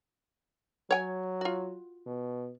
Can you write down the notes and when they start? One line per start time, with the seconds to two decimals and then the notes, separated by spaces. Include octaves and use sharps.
0.91 F#3 C#5 G5 G#5
1.41 F4 F#4
2.06 B2